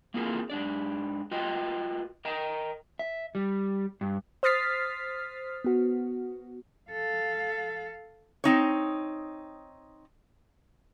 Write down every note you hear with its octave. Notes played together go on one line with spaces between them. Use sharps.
A#3 C4 E4 F4 G#4 A#4
G#2 D4 D5
F4 F#4 B4 D#5 G5
A#4 D#5 G5 A#5
E5
G3
G2
C5 D#6 F6 A6 B6 C7
B3 F#4
A4 F5
C4 D#4 C#5